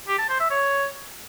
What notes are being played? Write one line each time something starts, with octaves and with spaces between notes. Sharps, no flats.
G4
A5
C5
E5
C#5